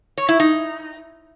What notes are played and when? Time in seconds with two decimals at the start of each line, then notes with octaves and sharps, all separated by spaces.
0.18 C#5
0.29 E4
0.40 D#4